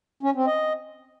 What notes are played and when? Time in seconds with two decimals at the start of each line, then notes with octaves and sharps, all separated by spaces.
0.23 C#4
0.35 C4
0.47 D#5